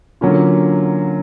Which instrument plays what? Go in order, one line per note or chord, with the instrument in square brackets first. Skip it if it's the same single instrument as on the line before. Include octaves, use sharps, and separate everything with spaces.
[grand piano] D3 F#3 A#3 C#4 F4